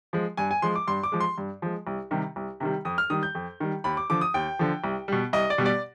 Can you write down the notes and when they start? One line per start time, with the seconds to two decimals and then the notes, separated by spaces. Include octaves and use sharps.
0.13 F3 G#3
0.37 G2 G#5
0.51 G#5
0.62 F3 G#3 C6
0.75 D6
0.87 G2 C6
1.03 D6
1.12 F3 G#3
1.20 C6
1.38 G2
1.62 F3 G#3
1.87 C2
2.11 C3 D#3 G3
2.36 C2
2.60 C3 D#3 G3
2.85 F2 D#6
2.98 F6
3.10 D#3 G3 D#6
3.23 G6
3.35 F2
3.60 D#3 G3
3.84 D#2 B5
3.97 D6
4.10 D3 F3 D6
4.21 D#6
4.34 D#2 G5
4.59 D3 F3
4.84 C2
5.08 B2 G3
5.33 C2 D#5
5.50 D5
5.58 B2 G3
5.66 D5